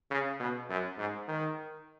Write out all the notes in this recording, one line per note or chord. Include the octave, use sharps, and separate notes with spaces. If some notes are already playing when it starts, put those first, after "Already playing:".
C#3
B2
F#2
G#2
D#3